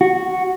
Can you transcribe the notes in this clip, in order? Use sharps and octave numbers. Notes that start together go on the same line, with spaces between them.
F#4